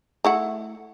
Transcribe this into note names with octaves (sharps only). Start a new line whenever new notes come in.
A3 E4 F#5